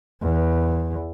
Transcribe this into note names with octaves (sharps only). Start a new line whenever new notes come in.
E2